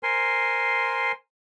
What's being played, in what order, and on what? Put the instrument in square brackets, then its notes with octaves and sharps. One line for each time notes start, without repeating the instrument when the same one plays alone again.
[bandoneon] A#4 C5 G#5 C6